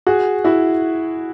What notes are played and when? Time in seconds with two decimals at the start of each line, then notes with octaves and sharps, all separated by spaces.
0.07 F#4 G#4
0.44 E4 F#4